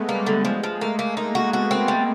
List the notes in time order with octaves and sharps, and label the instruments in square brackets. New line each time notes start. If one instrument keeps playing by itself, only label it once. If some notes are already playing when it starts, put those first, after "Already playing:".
Already playing: [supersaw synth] G#3 A3 B3
[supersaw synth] G3 [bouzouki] A#3
[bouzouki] D3
[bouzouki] F3 [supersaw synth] G#3
[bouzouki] F3
[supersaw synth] A3 [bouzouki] A#3
[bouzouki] A#3
[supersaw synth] A#3 [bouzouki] D#4
[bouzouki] F#4
[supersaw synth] B3 [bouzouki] F#4
[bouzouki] C4
G3